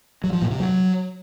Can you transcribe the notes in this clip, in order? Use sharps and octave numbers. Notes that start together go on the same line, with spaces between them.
F#3
F3
A#2
C3
F#3